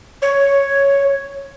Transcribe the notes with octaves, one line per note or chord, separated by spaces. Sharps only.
C#5